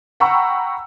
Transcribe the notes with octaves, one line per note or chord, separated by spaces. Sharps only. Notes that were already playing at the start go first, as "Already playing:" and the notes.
F#5 G5 A#5 B5 C#6 E6